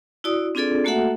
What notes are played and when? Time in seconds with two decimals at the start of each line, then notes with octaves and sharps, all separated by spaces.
0.24 E4 F#4 D5 D#6
0.55 C4 D4 F4 G#4 A4 D5
0.84 A3 A#3 F#4 A4 E5 F#5